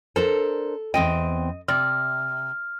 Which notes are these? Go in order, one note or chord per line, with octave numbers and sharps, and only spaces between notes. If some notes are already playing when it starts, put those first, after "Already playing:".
D4 A4 A#4 C5
E2 C4 D#5 G5
C3 D5 F6